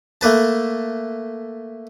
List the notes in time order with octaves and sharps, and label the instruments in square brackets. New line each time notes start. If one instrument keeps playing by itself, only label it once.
[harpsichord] A3 A#3 B4 A5